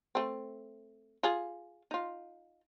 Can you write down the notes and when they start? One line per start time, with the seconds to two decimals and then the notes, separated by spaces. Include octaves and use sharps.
0.15 A3 C4
1.23 F4 G#4
1.91 D#4 F4